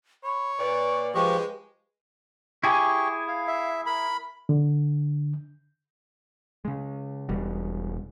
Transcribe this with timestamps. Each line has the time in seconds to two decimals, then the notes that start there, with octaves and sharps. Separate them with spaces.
0.24 C#5 B5
0.59 A#2 B4 D5
1.15 F3 G#3 G4 B4 D#5 C#6
2.64 E4 G4 G#4 G#5 C#6
3.28 F5
3.47 E5
3.86 A#4 B5
4.49 D3
6.65 C#3 G#3
7.29 E1 B2 G3